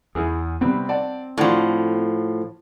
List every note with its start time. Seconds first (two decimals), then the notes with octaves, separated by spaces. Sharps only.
0.15 E2 E4 G#4
0.61 C3 G3 B3 C4
0.89 D5 F#5 A5
1.38 A2 F3 D4 F#4